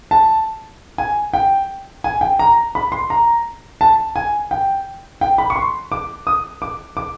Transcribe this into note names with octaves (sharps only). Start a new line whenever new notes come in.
A5
G#5
G5
G#5
G5
A#5
B5
C6
A#5
A5
G#5
G5
G5
B5
C#6
C6
D6
D#6
D6
D6